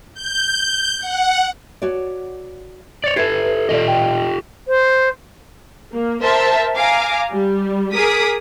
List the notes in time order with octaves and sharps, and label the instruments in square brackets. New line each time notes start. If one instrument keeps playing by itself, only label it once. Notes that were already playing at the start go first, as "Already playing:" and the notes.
[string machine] G6
F#5
[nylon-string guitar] F#4 C#5 D5
[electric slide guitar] C#5 D5 [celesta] A6 C#7
[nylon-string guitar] E4 B4 C5 [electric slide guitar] G4 A4 [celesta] G#6 C7
[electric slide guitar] F4 G4 D#5 [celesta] A4 D5
[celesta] G5
[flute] C5
[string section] A#3
A#4 C5 E5 A5
F5 G#5 A#5 D6
G3
G#4 A#4 D6 D#6 B6